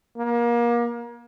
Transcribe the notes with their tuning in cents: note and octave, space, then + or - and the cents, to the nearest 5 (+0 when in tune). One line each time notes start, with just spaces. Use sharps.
A#3 +30